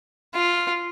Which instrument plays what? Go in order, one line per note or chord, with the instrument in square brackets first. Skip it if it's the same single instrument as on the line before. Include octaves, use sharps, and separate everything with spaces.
[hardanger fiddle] F4